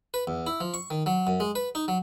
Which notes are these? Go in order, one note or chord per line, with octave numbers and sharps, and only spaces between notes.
B4
E2
E4
F3
C#6
D#3
F#3
F#2
G#3
B4
D#4
F#3